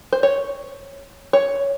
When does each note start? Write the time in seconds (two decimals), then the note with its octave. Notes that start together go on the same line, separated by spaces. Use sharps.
0.13 C5
0.23 C#5
1.33 C#5